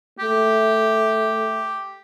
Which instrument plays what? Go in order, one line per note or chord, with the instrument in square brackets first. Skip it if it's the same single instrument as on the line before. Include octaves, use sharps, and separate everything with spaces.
[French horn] A3 [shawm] G4